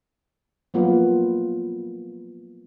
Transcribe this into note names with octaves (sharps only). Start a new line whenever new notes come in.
F3 F#3 A#3 B3 F4 B4